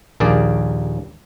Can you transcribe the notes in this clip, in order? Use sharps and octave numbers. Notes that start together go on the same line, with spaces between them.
A#1 D#2 A#3 G#4 D5